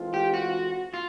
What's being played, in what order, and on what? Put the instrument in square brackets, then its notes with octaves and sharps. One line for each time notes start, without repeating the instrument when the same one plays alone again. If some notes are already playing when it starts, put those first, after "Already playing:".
Already playing: [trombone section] E3 G#3 C4 F4 A4
[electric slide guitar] G4
F#4
F4